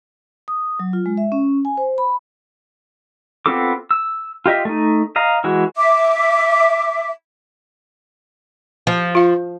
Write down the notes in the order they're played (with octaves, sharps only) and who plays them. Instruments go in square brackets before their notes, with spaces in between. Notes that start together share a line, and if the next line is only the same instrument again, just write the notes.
[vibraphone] D#6
F#3
F4
G#3
E5
C#4
G#5
C5
B5
[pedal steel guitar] B3 C4 F4 A4 D6
E6
F4 G4 D#5 E5
A3 D#4
D#5 F5 A#5
E3 G#3 F#4
[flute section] E5 D6
[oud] F3
[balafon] F4 F5